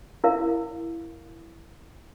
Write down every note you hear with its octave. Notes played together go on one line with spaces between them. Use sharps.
E4 A#4 F5